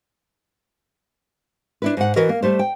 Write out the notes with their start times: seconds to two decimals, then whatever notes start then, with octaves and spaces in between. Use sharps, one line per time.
1.82 D4 E4 B4
1.97 G#2 F#5
2.16 E3 F#4 A#4 D#5
2.29 A#3
2.42 G3 A3 C5
2.59 G5